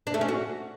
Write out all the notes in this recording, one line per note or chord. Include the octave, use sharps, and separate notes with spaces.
D4
A3
C#4
F#4